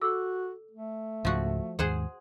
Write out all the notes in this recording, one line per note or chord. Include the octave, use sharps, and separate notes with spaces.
F#4 A4 D6 E6
A3
C#2 G#2 C#3 F3 F#4
D#2 G#2 G#4 C5 F#5